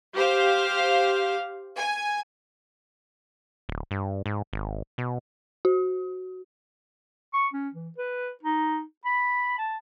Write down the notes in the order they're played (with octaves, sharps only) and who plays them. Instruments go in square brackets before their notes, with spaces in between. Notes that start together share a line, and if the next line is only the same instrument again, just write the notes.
[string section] G4 C5 F5
G#5
[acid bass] D1
G2
G#2
G#1
B2
[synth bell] F#4
[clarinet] C#6
C#4
E3
B4
D#4
B5
A5